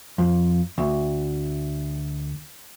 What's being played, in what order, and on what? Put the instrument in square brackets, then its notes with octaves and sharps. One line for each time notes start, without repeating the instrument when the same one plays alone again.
[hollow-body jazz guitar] F2
D2